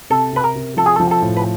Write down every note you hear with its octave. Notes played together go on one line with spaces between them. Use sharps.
C3 A4
C3 B4
A#4
C3
F3 A4
G#4
F3 A4
A4
A2
B4